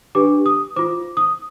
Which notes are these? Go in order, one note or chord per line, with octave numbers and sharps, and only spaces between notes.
D4 G4 B4 D6
D#6
F4 C5 D6
D#6